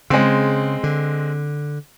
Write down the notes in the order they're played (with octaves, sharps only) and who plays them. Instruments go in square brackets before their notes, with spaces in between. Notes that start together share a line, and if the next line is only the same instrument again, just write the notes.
[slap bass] C#3 [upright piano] G#3 C4
[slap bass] D3